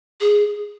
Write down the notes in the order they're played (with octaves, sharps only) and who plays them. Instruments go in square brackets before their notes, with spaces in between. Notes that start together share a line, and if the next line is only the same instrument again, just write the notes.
[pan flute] G#4